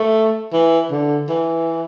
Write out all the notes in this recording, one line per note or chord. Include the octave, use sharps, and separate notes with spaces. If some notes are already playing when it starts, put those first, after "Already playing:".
Already playing: A3
E3
D3
E3